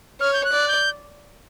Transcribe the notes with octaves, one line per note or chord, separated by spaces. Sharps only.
C#5 F6
G6
F#6
D5
G6